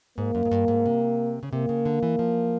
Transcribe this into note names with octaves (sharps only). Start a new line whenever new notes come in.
G#2 A#3
F#2
G#2
G2
G#2
C3
C#3
C3 A#3
C#3
D3
E3
F3